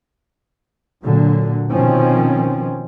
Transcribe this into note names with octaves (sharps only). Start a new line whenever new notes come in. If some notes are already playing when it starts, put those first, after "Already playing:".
A#2 D3 F#3
B2 D#3 F3 C4 C#4